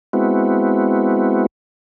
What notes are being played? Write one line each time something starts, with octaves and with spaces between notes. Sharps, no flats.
G#3 B3 C4 E4 F#4